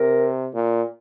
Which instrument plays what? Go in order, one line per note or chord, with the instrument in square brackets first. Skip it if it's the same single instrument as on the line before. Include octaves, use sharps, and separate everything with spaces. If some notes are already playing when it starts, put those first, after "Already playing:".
Already playing: [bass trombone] C3 [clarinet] A#4
[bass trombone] A#2